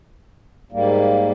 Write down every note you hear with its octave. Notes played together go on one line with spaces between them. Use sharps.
G#2 G3 A#3